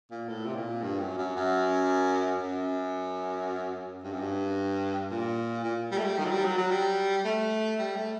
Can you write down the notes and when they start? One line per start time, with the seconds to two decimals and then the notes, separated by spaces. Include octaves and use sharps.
0.11 A#2
0.29 A2
0.46 C3
0.55 A#2
0.82 G2
1.00 F#2
1.18 F#2
1.36 F#2
2.43 F#2
4.03 G2
4.12 F#2
4.20 G2
5.11 A#2
5.64 A#2
5.92 G3
5.98 A3
6.04 G3
6.18 D#3
6.25 F#3
6.31 G3
6.45 F#3
6.58 F#3
6.71 G3
7.25 A3
7.79 G3
7.96 A3